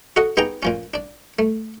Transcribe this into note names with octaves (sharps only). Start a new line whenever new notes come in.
F#4 A4 D#5 F#5
B3 D#4 G4 G#4 G5 A#5
A#2 F3 C#4
D4 D5
A3